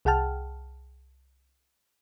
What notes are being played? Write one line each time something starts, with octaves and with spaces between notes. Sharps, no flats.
C2 G#4 F#5 G5 A5 F6